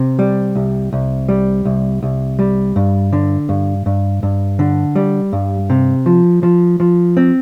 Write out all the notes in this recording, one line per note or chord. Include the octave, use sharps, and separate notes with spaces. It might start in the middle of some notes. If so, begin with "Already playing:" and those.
Already playing: C3
G3
C2
C2
G3
C2
C2
G3
G2
D3
G2
G2
G2
D3
G3
G2
C3
F3
F3
F3
C4